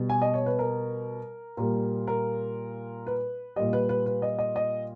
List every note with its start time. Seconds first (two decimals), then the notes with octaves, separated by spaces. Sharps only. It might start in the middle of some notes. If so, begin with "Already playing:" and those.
Already playing: B2 G3
0.09 G#5
0.22 D#5
0.34 C#5
0.46 B4
0.59 A#4
1.57 A#2 G3 A#4
2.07 A#4
3.07 B4
3.56 A#2 G3 D#5
3.73 B4
3.89 B4
4.06 B4
4.22 D#5
4.39 D#5
4.56 D#5